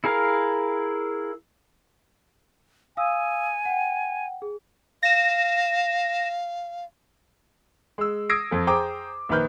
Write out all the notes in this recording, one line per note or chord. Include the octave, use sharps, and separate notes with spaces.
E4 G#4 A#4 F5
F5 G#5 D#6 E6
F#5 G5
G#4
F5 A#6 E7
G#3 E6
D#6 E6 G#6 A#6 C7 D7
F2 A4
G#4 C5 G5 A#5 D6 D#6
A#1 D#3 A#4 B4 F6 G6